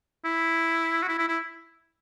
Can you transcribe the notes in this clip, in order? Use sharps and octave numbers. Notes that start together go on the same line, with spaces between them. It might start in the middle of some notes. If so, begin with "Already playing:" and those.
E4
F#4
E4
E4
E4